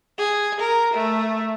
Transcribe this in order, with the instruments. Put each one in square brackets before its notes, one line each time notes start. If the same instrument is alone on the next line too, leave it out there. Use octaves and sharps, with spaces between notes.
[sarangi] G#4
A#4
A3